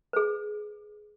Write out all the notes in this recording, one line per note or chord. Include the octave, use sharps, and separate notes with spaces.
G#4 B4